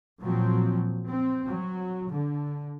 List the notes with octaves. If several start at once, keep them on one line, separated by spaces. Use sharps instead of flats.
A#2 F3 F#3 C4
C4
F#3
D3